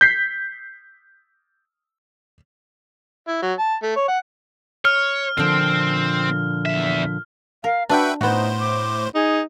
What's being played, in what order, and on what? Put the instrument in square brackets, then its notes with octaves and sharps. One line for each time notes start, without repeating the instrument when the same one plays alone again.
[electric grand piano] G6 B6 C7
[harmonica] E4
F#3
A5
A3
C#5
F#5
[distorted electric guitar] C#5 [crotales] F6
[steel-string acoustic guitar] A#2 D3 F3 [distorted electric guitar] C4
[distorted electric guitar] E2 E5
[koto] A#4 [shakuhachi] F5
[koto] D4 [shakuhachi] F#4 [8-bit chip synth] B4 E5 G5
[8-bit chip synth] A2 C5 [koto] B3 F#4 [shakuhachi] D#4
[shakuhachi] D6
[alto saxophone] D#4 [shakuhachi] G#4